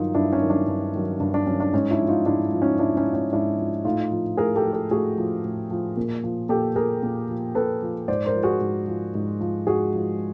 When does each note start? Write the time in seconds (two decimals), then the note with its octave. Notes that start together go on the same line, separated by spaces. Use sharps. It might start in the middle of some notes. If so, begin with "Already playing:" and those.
Already playing: G2 D#3 F#3 D#4 F4
0.15 G2 D4 E4
0.33 C#4 D#4
0.42 D#3 F#3
0.50 D4
0.68 G2
0.95 D#3 F#3
1.20 G2 D4
1.34 D4
1.46 F#3 C#4
1.51 D#3
1.60 D4
1.73 G#2 C#4 D#4
1.91 D4 E4
2.00 F3
2.08 D#4 F4
2.26 G#2 D4 E4
2.53 F3
2.62 C#4 D#4
2.79 G#2 D4 E4
2.97 C#4 D#4
3.06 F3
3.14 C#4
3.32 G#2 D4 E4
3.59 F3
3.85 A2 D#4 F4
4.12 F3
4.37 A2 G#4 A#4
4.56 G4 A4
4.65 F3
4.73 G4 A4
4.91 A2 F#4 G#4
5.18 F3
5.44 A2
5.71 F3
5.97 A#2
6.24 F3
6.49 A#2 G4 A4
6.76 F3 G#4 A#4
7.03 A#2
7.29 F3
7.55 A#2 A4 B4
7.82 F3
8.08 G#2 C5 D5
8.26 A#4 C5
8.35 F3
8.43 F#4 G#4
8.61 G#2
8.88 F3
9.15 G#2
9.41 F3
9.67 G#2 F#4 G#4
9.94 F3